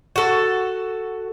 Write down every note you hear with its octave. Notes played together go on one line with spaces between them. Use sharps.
F#4 A4